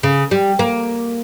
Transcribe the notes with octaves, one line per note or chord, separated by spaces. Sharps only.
C#3
G3
A#3